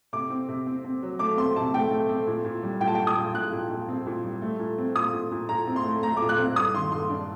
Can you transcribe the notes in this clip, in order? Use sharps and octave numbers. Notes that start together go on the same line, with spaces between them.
C3 D6
C4
C3
C4
C4
F#3
A3 D6
C4 C6
C3 A5
A3 G5
A3
C4
A#2
A#2
G3
A#2 G5
A5
G5
A#2
D#6
A#2
A#2 F#6
A#2
A#2
C4
A#2
G3
A3
A#2
C4
A#2 D#6
A#2
A#2
A#2 A#5
C4
C6
A3
A3 A#5
D6
A#2
F#6
C4
G2 D#6
D#3 C6
G2 C6
D4